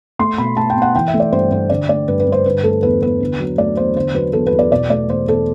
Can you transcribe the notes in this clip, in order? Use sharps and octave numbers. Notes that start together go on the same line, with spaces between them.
A3 C6
B2 B5
A3 A5
G5
B2
F#5
E3 G5
E5
A3
D5
G2 C5
G2 C5
D3 D5
A3 D5
G2 B4
B4
G2
C5
D3 B4
A3 A4
E2 B4
E2 B4
D3
F#3
A3 D5
E2 C5
D3 C5
F#3 B4
E2 A4
B4
E2
D5
B2 D5
A3 D5
E2 C5
E2 A4